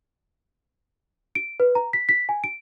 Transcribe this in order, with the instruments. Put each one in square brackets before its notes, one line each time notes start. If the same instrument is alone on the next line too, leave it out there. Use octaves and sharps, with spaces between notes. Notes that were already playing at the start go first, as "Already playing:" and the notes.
[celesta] D7
B4
A#5
B6
B6
G#5
D7